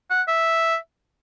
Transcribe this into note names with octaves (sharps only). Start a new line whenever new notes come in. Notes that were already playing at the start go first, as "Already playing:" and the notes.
F#5
E5